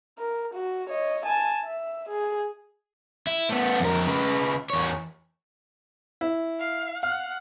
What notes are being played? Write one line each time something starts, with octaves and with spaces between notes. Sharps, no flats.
A#4
F#4
C#5 D#5
G#5 A5
E5
G#4
E4
A3 B3
F2 A#4
C#3 B4
E2 C#5
E4
F5
F5 F#5